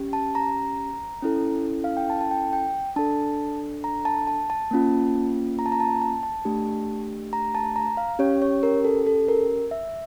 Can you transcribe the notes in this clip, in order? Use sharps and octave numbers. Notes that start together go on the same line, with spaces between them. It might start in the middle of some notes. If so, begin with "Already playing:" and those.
Already playing: C#4 G4
A5
A#5
C#4 E4 A4
F5
G5
A5
A5
G5
G5
D4 A4 A5
A#5
A5
A5
A5
A#3 C#4 F4
A#5
A5
A#5
A5
A5
A5
A3 D4 G4
A#5
A5
A#5
F5
C#4 G4 C#5
C#5
A#4
A4
A4
A#4
E5